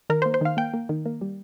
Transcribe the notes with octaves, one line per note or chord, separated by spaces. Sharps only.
D#3 A#4
C5
A#3
C5
D#3 F5
A#3 G5
A#3
D#3
A#3
G3